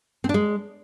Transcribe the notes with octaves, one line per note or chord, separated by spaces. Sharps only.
C4
D4
G#3